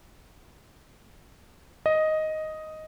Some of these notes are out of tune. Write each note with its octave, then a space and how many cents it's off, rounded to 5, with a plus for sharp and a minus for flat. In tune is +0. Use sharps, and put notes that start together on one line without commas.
D#5 +5